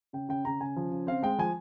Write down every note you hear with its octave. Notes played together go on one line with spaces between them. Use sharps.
C#3 G5
C#3 G5
C#3 A#5
C#3 G#5
F3
C#3
C4 F5
G#3 G5
F3 G#5